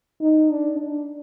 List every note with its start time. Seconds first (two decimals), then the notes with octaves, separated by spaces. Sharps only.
0.21 D#4
0.50 D4
0.79 D4